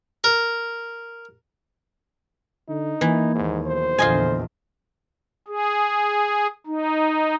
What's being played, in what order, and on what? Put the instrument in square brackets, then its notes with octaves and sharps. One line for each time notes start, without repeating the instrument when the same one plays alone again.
[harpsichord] A#4
[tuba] D3 [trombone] D#4
[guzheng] E3 [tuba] A#3
[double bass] D#2 [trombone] G#2
[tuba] B1 [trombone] C5
[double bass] A#1 E2 [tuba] D3 [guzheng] F4 D#5 G#5
[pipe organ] G#4
D#4